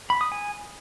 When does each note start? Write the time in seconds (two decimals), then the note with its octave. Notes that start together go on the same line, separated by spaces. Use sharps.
0.10 B5
0.21 D#6
0.32 G#5